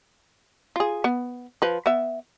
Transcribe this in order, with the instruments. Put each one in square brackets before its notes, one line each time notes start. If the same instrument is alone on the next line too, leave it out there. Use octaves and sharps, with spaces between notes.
[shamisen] F4 G#4
B3
F3 B4
B3 E5